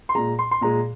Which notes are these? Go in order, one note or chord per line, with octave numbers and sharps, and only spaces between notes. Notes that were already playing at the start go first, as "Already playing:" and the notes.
C6
A#2 G#3 A#5
C6
C6
A#2 G#3 A#5